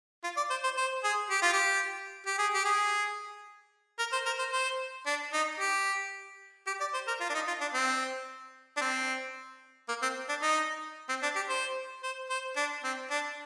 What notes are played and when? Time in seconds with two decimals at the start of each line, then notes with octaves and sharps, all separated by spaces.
0.24 F4
0.37 D5
0.50 C5
0.64 C5
0.77 C5
1.04 G#4
1.31 G4
1.42 F4
1.53 G4
2.26 G4
2.38 G#4
2.54 G4
2.65 G#4
3.99 A#4
4.13 C5
4.26 A#4
4.39 C5
4.52 C5
5.06 D4
5.33 D#4
5.60 G4
6.67 G4
6.80 D5
6.94 C5
7.07 A#4
7.20 F4
7.29 D4
7.34 D#4
7.47 F4
7.61 D4
7.74 C4
8.77 D4
8.81 C4
9.88 A#3
10.02 C4
10.29 D4
10.42 D#4
11.09 C4
11.23 D4
11.36 G4
11.49 C5
12.03 C5
12.30 C5
12.56 D4
12.84 C4
13.11 D4